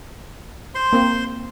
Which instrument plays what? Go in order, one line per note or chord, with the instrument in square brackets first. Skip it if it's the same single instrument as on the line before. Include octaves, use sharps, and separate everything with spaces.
[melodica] C5 C6
[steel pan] A#3 C4